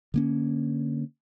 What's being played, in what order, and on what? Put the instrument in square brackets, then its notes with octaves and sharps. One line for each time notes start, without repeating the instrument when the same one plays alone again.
[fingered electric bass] D3 A#3 C#4